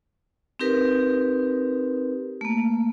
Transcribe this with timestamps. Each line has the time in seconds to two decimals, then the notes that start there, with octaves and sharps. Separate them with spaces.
0.59 C4 D#4 G4 A#4 B4
2.41 A3 A#3